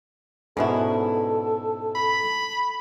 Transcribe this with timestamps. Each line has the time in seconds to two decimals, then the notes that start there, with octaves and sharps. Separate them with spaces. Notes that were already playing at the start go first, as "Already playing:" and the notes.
0.57 G#2 B2 D3 B3 C#4 E4 A4
1.95 B5